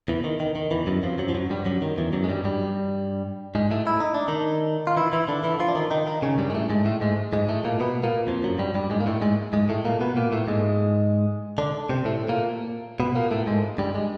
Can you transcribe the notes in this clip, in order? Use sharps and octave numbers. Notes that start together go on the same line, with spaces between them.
E2 E3
D#3
D#3
D#3
E2 E3
F#2 F#3
F2 F3
F#2 F#3
F3
F#2 F#3
G2 G3
F#2 F#3
D#3
E2 E3
F#2 F#3
G#3
G2 G3
G2 G3
G#2 G#3
A2 A3
E4
D#4
D4
D#3 D#4
F4
E3 E4
E3 E4
D3 D4
E3 E4
F3 F4
D4
D#3 D#4
D#3 D#4
D#3 D#4
C#3 C#4
G2 G3
G#3
A2 A3
G#2 G#3
A2 A3
G#2 G#3
G#2 G#3
A2 A3
A#2 A#3
B2 B3
A#2 A#3
F2 F3
F#2 F#3
G2 G3
G2 G3
G#2 G#3
A#3
A2 A3
G#2 G#3
G#2 G#3
A2 A3
A#2 A#3
B2 B3
A#2 A#3
A2 A3
G#2 G#3
D3 D4
C3 C4
A2 A3
A#2 A#3
B2 B3
A#2 A#3
A2 A3
G#2 G#3
G2 G3
G#3